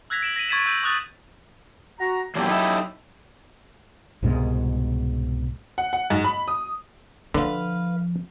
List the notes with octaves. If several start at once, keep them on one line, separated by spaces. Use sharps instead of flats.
E6 F#6 G#6 A#6 B6 F7
D7 E7 F#7
A#6 B6 D#7 F#7
C#6 G#6 A6 B6 D#7 E7
E6 G6 D#7
C#6 D#6 F#6 A6 F#7
F#4 A#5
E2 A#2 F#3 D4 E4 G4
D#4 A4 E5
C2 G#2 B2 G#3
F#5
F#5
G#2
B5
D#6
D3 F3 B4 F5